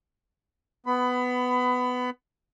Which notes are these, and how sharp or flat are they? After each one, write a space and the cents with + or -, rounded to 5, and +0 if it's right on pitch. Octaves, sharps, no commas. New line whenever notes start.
B3 +15 B5 +25